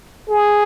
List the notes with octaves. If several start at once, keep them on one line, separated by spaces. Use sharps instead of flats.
G#4